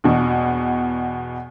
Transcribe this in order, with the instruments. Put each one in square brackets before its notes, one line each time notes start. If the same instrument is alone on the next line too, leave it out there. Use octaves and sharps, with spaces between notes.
[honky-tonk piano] E2 B2